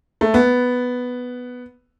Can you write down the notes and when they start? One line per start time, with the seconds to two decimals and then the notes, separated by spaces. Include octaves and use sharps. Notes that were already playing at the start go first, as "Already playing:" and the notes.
0.21 A3
0.34 B3